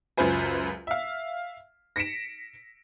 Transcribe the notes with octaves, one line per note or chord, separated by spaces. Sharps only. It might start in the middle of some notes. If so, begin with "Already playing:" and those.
C#2 F#2 F4 B4 C5 G#5
E5 F5
A#6 B6 C#7 D7 E7